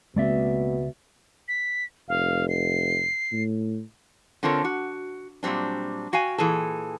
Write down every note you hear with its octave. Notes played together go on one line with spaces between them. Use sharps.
C#2 B2 G#3 A#3 C4 D5 E5
B6
F1 F5
C7
A2
D3 C4 F4 A4 A#4 C#5
F#4
A#2 F#3 G3 C4 D4
F#4 F5 G5 G#5
A#2 E3 G#4 A4